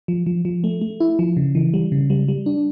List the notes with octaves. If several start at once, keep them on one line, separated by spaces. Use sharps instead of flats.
F3
F3
F3
A3
A3
E4
F3
C#3
E3
G3
C#3
G3
G3
D4